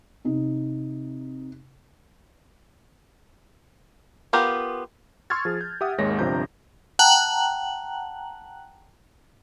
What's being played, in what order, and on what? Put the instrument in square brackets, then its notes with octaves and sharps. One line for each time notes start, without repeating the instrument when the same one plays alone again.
[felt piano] C3 D#4
[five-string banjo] B3 F4 G4 A#4
[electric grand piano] C6 C#6 E6 F6 G#6 A6
F3 G#4
G6
G4 E5 F#5 D#6
G#1 D#2 G#3 C#5 A#6
G1 C3 F3 D4 A#5 G6
[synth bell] F#5 G5 A5 A#5 F#6 F#7